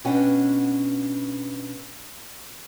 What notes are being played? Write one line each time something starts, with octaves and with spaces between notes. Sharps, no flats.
B2 C#4 D4 B4 F#5 G5